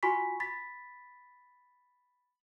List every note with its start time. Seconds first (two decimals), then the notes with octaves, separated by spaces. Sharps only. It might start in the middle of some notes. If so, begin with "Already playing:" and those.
0.03 F4 F#4 G#5 B5 C#6 B6
0.40 B5 A6 B6